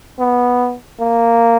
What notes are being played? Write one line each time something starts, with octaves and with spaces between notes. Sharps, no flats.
B3
A#3